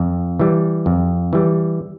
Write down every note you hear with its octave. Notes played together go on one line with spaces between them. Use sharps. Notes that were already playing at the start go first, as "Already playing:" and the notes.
Already playing: F2
E3 G3
F2
E3 G3